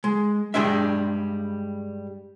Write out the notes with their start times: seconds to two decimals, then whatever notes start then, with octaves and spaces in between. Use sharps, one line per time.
0.04 G#3
0.54 G2 D#3 G3 G#3 D4 E5